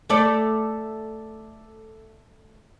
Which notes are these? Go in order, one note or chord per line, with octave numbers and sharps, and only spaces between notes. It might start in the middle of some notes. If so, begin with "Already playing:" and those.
A3 A4 D5